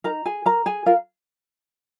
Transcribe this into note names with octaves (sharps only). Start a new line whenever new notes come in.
D#4 A#4 A#5
G#4 G#5
A#4 A#5
G#4 G#5
F4 A#4 F5